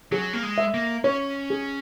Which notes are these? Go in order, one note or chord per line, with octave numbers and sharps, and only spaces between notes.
F#3 G#4
A#3
G#3
E5
A#3
C#4 C#5
G#4